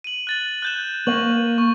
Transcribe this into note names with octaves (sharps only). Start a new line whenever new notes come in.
D#7 F#7
F#6 A6 F#7
F#6 G6 E7
A#3 C#6 F#7
C#6